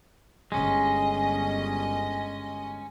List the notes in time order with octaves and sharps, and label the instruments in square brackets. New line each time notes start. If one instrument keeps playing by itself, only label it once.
[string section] G1 D#5 [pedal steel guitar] G#3 C#4